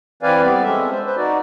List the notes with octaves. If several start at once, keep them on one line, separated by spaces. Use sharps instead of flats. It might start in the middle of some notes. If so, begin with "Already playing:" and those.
E3 C4 B4 D5 F5 G#5
G3 B3 C4 D5
G#3 C4 C#4 A4 E5
C5
B4 C5
D#4 F#4 D5